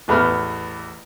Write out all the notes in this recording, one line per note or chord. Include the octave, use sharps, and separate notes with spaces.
A1 E2 A3 B3 B5 F6